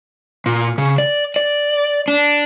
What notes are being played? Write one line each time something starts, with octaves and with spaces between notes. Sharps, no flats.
A#2
C#3
D5
D5
D4